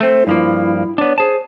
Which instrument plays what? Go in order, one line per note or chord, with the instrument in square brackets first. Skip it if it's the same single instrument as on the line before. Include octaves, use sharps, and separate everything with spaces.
[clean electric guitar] A3 C4 [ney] C5
[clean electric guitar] G2 F3 A#3 [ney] E4
[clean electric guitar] B3 D4 [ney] C#5
[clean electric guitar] G#4 A5 [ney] C5